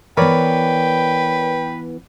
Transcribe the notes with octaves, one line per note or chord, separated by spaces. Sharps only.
E3 B3 A#4 B4 C#5 D5 G5